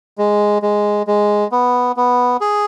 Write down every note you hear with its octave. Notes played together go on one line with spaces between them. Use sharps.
G#3
G#3
G#3
B3
B3
G#4